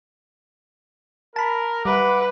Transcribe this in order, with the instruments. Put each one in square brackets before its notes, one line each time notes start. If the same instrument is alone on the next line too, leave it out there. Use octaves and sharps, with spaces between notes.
[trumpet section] A#4 [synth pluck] A5 B5
[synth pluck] G3 [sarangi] B4 [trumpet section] E5 F#5 D6